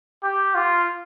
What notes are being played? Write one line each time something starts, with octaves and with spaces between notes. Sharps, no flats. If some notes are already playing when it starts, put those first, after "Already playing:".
G4
F4